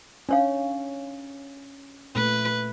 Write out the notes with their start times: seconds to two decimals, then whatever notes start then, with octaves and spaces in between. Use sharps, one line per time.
0.29 C#4 D4 C#5 F5
2.16 A#2 A3 B4